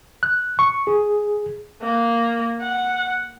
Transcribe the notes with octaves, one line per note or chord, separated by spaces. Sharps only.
F#6
C#6
G#4
A#3
F#5